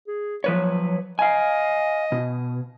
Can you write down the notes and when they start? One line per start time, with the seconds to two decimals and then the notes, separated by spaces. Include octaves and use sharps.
0.07 G#4
0.44 F3 F#3 B4 C#5
1.19 D#5 F5 G#5
2.12 B2